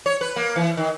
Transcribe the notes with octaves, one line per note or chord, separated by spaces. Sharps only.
C#5
B4
A#3
E3
D#3